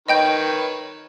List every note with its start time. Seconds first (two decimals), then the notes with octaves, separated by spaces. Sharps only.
0.08 D#3 B4 C#5 D#5 G5 G6